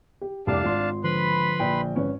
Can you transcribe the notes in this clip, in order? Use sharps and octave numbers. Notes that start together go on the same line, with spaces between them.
G4
F1 C2 D4 G4 F5 A5 D6
G#1 F4 C6
D3 F3 B4 B5 C6
A#1 G5
G#1 C#4 B4